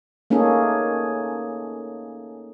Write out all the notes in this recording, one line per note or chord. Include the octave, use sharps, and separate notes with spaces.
A3 A#3 C#4 D#4 G#4 A4